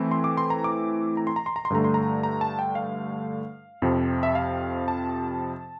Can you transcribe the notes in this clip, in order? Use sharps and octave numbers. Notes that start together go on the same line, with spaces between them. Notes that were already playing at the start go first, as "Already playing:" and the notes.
Already playing: E3 A3 C4 E4
C6
D6
C6
A#5
D6
A#5
C6
A#5
C6
A#5
C6
G2 D3 A3 A#5
C6
A#5
A#5
A5
G5
F5
F2 C3 F3
E5
F5
A5